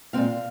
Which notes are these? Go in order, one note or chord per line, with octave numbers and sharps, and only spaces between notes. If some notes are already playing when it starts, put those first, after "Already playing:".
A#2 G#3 C4 F5